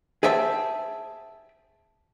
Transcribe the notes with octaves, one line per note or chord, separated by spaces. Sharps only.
G#4 C5 E5 G5 A5